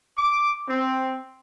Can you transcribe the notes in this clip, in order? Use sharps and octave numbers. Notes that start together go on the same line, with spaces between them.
D6
C4